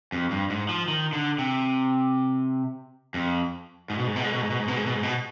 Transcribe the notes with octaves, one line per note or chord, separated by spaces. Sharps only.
F2
G2
G#2
F3
D#3
D3
C3
F2
G#2
B2
G#2
B2
G#2
B2
G#2
B2
G#2
B2
G#2
B2
G#2
B2